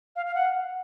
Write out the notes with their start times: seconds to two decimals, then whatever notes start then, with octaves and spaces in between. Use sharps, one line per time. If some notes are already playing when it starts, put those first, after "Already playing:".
0.15 F5
0.25 F5
0.34 F#5